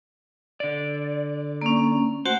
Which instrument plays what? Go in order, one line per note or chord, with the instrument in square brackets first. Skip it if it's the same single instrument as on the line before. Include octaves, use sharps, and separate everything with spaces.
[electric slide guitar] D3 D5
[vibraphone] A#3 C#4
[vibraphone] A3 F#4 F#5 [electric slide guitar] C5